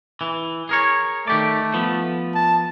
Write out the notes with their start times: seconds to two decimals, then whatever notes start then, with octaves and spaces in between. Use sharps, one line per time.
0.21 E3
0.69 G#4 A#4 C#5
1.28 D#3 A3 G4 D5
1.74 F3 B3
2.35 A5